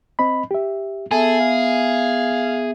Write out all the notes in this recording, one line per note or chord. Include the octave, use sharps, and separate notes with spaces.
C4 D#5 B5
G4 E5
B3 G#4 A4 E5 G#5
F5